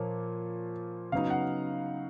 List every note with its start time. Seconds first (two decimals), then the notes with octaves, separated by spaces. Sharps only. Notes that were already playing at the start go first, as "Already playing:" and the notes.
Already playing: A#2 F3 A#3 C#5
1.12 C#3 F#3 B3 D#4 F5
1.30 F#5